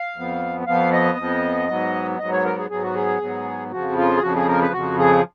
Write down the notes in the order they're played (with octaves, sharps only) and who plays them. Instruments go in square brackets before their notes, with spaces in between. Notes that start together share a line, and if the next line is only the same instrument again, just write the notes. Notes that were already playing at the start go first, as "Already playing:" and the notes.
Already playing: [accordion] F5
F2 F3 B3
F2 F3 B3 F5
D#5
F2 F3 B3
G#2 F#3 B3
G#2 F#3 B3 D#5
C#5
A#4
G#4
G#2 F#3 B3 G#4
F#4
G#4
G#2 F#3 B3
F2 C#3 F3 F#4
F4
G#4
F2 C#3 F3 F#4
G#4
A#4
B4
F2 C#3 F3 F#4
G#4